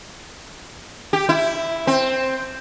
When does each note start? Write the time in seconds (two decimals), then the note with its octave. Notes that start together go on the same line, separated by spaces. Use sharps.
1.13 G4
1.29 E4
1.87 C4